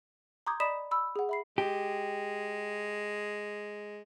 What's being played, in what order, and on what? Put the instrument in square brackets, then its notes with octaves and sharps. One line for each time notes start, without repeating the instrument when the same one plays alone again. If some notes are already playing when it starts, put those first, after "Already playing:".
[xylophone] A#5 C6 D6 D#6 G6 G#6
D5 D#5 B5 D#6 B6 E7
B5 E6
G#4 F#5
E5 B5 C7
[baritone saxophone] G#3 [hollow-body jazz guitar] G4